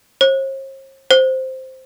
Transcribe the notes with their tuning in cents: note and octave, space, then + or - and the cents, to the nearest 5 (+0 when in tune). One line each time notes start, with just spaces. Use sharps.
C5 +45
C5 +0